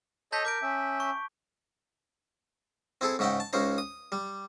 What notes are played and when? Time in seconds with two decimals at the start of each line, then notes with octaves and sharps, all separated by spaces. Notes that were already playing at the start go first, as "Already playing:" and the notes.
0.32 A4 C#5 D#5 A5 G6 B6
0.45 A#4 D6 G6 D7
0.62 C#4 E5
1.00 C#6
3.01 C4 E4 G#4 A4
3.19 G#2 C#3 D#4 E5 F#5 G5
3.40 A5
3.53 C#2 C#3 C#4 D#4 C5 A#5
3.78 D#6
4.12 G3